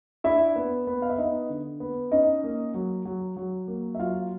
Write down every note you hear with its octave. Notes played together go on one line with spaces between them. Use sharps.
D4 E4 E5
B3
B3
F5
E5
B3 D#4 D#5
D3
B3
C#4 D#4 D#5
A#3
F#3
F#3
F#3
A#3
E5
F#3 F4 F5